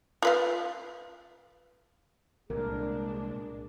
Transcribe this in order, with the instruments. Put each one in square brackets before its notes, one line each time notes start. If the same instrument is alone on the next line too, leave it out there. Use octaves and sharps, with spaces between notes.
[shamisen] F4 B4 F5
[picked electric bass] C2 A#2 [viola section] G#3 D4 [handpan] A#4